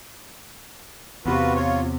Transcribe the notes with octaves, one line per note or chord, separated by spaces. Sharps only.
E2 C3 F4 F#4 B4
F4 C#5